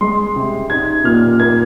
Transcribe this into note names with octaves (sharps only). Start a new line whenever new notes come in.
G#3 C6
C3
D#4 G#6
A#2 F6
A#3 G#6